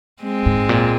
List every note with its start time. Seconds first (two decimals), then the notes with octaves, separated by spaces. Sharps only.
0.23 G#3 C4
0.46 G#2
0.69 A#2